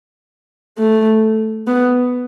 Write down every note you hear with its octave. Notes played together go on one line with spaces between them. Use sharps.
A3
B3